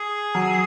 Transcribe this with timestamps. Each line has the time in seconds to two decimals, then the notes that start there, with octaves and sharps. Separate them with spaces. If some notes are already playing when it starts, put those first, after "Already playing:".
Already playing: G#4
0.35 F#3